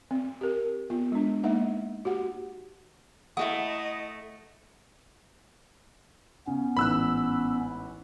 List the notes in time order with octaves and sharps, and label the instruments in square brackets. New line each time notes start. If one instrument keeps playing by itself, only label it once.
[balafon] C4
G4 A#4
B3 F4
G#3 D4
G#3 A#3 D#4 E5 F#5
F#4 G4 F#5
[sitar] A3 [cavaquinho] E4 F#4 D#6 [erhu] D#5 [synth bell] F#5
[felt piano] C#3 [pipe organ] B3 C#4
[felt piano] A1 G#2 [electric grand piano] B5 E6 F#6